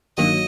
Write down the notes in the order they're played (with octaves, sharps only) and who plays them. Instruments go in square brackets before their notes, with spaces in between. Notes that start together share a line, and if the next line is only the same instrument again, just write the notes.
[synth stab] G1 G2 D#3 F#3 A#3 [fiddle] D#5